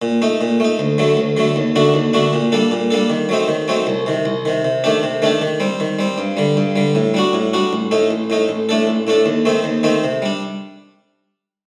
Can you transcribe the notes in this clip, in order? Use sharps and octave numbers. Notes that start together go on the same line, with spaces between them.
A#2
A3 D#4
A#2
A3 D#4
D2
D3 F#3 A3
D2
D3 F#3 A3
D#2
D3 A3 D4 F#4
D#2
D3 A3 D4 F#4
A#2
G3 A#3 D4 A4
A#2
G3 A#3 D4 A4
D#3
F#3 A3 C4 D#4
D#3
F#3 A3 C4 D#4
C2
C3 D#3
C2
C3 D#3
C3
D#3 A3 D4 G4
C3
D#3 A3 D4 G4
D#3
G3 C4
D#3
G3 C4
G2
D3 G3
G2
D3 G3
A2
G3 D4 F#4
A2
G3 D4 F#4
A1
A2 A3 D#4
A1
A2 A3 D#4
A1
A2 A3 D4 A4
A1
A2 A3 D4 A4
D#2
D#3 A3 C4 D#4
D#2
D#3 A3 C4 D#4
C3
G3 D4